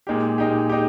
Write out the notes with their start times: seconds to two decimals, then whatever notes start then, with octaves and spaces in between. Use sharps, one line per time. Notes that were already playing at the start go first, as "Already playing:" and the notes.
0.07 A#2 G#3 D#4 G4
0.38 A#2 G#3 D#4 G4
0.69 G#3 D#4 G4